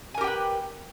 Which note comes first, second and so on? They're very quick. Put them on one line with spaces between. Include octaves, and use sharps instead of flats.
G#5 A#4 G4 G5 B4